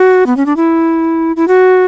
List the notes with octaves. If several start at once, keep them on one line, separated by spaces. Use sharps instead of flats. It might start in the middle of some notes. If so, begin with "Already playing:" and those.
Already playing: F#4
B3
C#4
D4
E4
E4
F#4